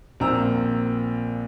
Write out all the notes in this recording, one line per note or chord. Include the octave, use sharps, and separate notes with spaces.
A#1 A#2 C4 A#5 E6